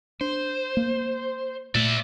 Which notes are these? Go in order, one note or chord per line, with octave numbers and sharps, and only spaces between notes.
D4 C5
A#3
A#2 A3 D5 E5